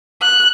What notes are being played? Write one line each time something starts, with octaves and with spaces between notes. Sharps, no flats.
F#6